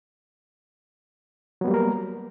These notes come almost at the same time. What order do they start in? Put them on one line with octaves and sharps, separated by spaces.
F#3 B3 G3 A#3 A#4